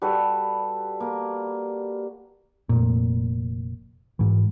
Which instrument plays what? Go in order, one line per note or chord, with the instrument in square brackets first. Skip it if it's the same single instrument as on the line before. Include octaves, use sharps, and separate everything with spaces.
[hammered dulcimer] G3 F#4 A4 B4
A#3
[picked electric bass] F1 A#2
G#2 E3